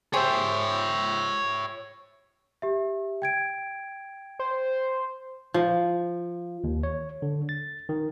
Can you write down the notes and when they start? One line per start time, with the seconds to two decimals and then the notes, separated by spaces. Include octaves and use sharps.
0.13 G4 G#4 C5 C#5 E5
2.62 G4 E5
3.22 G5 G#6 D7
4.39 C5
5.54 F3
6.64 D#2
6.83 C#5
7.22 D3
7.49 A6
7.89 D#3